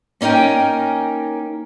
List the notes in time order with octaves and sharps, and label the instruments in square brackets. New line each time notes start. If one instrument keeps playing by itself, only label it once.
[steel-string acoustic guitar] A#3 C#4 D#4 A#4 G5